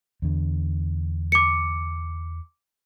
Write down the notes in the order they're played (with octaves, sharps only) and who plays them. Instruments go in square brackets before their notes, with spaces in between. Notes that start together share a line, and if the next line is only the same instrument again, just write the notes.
[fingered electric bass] E2 D3
[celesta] D6 C#7